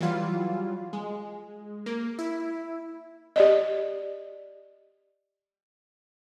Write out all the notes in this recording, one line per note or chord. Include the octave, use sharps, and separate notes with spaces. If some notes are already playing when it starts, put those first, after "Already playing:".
E3 F#3 G3 F4
G#3
A#3
E4
G4 D5 D#5